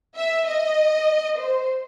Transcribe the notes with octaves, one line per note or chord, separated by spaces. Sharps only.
E5
D#5
C5